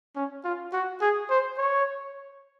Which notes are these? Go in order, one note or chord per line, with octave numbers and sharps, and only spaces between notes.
C#4
F4
F#4
G#4
C5
C#5